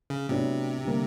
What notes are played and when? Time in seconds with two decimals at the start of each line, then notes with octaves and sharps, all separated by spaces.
0.10 C#3
0.29 A2 C3 F#3 B3 D4
0.85 D3 G3 A#3